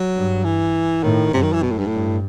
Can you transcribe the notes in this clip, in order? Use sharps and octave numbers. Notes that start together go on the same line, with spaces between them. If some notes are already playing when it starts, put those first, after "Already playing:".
Already playing: F#3
G2
E3
A2 D#3
F#2 C3
D#3
E3
B2
A2
G2
A2
G2